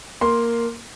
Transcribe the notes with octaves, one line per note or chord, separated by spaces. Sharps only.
A#3 C6